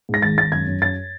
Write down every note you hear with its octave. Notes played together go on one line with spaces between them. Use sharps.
G#2 A#6
G#1 A6
G#1 A6
F#2 G#6
F#2
F#2 A6